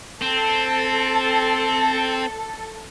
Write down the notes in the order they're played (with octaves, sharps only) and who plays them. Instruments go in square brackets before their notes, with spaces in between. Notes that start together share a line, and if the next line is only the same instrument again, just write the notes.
[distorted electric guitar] C4 [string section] A4